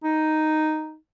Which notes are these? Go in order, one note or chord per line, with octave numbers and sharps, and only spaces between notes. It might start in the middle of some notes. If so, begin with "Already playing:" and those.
D#4